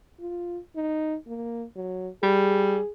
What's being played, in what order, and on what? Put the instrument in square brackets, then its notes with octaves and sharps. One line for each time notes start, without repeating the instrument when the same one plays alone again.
[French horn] F4
D#4
A#3
F#3
[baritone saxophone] G3 [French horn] G#4